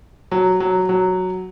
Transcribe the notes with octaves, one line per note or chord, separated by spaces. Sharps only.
F#3
F#3
F#3